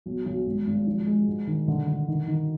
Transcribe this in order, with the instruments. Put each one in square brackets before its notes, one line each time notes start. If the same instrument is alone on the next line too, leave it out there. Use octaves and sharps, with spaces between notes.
[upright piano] B1
B1
G#1
G#1
F3
G#3
G#2
D#3
D3
D3
D#3
D#3